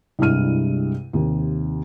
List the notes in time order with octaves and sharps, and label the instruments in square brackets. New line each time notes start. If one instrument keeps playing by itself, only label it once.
[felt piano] C2 G2 G#3 E4 F6 D#7
D#2 C3